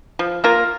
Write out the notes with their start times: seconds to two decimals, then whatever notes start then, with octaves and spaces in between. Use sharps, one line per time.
0.19 F3
0.44 A#3 F4 A#4